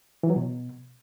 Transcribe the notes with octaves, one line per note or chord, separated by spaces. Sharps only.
E3
F#3
B2